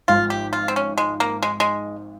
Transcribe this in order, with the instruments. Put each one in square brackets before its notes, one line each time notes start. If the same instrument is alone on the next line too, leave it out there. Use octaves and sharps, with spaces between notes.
[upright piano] G#1 G#2 F3 [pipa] F4
[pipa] G4
F4
C4
C#4
G#3
A#3
G#3
G#3